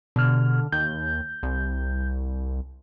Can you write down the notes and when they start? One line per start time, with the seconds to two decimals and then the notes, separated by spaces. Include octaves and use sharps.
0.16 B2 D3 F6
0.72 D#2 G6
1.43 C2